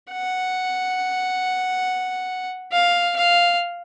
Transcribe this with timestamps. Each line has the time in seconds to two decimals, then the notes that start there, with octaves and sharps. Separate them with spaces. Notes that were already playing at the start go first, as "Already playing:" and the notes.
0.11 F#5
2.72 F5
3.16 F5